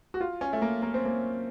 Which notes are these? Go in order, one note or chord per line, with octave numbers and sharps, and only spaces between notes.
F#4
F4
C#4
A3
A#3
A#3
C4
A#3